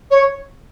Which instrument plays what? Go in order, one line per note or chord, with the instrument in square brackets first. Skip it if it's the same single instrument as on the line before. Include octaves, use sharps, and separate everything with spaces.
[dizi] C#5